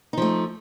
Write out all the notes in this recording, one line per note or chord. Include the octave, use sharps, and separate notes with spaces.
F3 A3 D#4